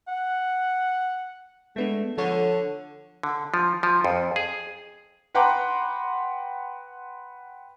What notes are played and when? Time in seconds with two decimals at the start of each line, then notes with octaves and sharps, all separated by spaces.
0.08 F#5
1.76 G#3 A3 B3 D4
2.18 D3 F3 A4 C#5
3.23 D3
3.54 F3
3.83 F3
4.04 F2
4.36 G#4
5.35 B4 F#5 G5 A#5 C6 D6